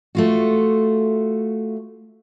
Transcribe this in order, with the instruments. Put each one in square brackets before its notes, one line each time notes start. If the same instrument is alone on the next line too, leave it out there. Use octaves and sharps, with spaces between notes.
[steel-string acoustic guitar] A3 F4 F#4